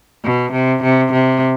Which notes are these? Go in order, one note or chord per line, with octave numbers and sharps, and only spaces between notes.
B2
C3
C3
C3